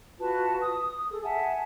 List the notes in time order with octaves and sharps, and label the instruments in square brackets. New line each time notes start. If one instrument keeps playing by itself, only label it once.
[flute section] F4 F#4 B4 A5
D#6
G#4 A4
E5 F#5 G#5 A5